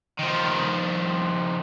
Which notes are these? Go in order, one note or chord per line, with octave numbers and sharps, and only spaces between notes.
D#3 F3